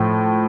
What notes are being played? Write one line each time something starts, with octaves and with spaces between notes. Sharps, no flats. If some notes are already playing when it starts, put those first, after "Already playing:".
Already playing: A2 F3